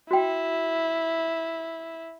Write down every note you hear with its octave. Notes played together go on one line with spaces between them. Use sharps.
E4 F#4 G5